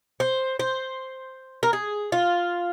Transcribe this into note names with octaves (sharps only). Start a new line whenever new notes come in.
C5
C5
A#4
G#4
F4